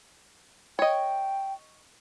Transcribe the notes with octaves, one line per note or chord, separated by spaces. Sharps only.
C#5 D#5 G5